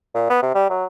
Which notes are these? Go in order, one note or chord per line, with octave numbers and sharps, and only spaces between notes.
A#2
B3
C3
G3
F#3